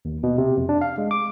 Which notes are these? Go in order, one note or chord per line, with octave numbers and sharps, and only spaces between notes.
D#2
B2
C3
F2
D4
F5
G#3
D6